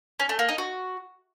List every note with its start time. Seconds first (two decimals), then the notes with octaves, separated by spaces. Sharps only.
0.20 C#4
0.29 A3
0.39 A#3
0.49 D#4
0.58 F#4